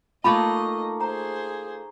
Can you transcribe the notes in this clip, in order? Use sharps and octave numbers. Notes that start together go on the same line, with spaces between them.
A3 A#3 D#4 F4 D#5 E5 B5 C#6
G#4 C5 A#5